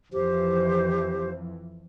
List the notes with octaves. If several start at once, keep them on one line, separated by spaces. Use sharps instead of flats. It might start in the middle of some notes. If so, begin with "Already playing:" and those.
F2 E3 F3 G4 C5